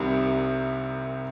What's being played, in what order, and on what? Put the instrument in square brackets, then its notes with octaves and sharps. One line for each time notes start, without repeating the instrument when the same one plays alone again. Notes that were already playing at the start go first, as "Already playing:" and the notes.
Already playing: [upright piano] C2 C3 D#3 G3